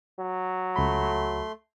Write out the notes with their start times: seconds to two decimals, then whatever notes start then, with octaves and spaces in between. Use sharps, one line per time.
0.19 F#3
0.76 C#2 A3 B5 C6